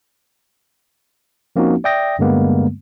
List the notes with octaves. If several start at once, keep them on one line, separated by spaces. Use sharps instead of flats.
F3 A#3 C4 C#4 D#4 F#4
D5 E5 G5 D#6 A#6
G2 D3 G3 G#3 A#3 B3